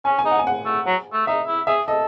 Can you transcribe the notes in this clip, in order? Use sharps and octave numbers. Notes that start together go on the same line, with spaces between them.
C#4 G#5
G#5
D#4
F#5
G#5
F#5
A3
F#3
A3
D#4 E5
E4
G#4 E5
A4 D#5